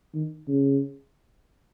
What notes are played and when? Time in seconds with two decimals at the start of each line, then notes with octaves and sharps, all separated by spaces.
0.14 D#3
0.48 C#3